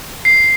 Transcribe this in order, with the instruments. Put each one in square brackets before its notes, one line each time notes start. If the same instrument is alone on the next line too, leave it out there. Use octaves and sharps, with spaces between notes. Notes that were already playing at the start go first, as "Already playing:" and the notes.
[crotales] C7